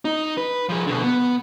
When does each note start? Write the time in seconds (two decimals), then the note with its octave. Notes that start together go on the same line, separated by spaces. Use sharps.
0.05 D#4
0.38 B4
0.69 F3 G#4
0.87 B2 D3
1.03 B3